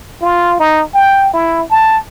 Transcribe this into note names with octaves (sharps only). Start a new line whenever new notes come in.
F4
D#4
G5
E4
A5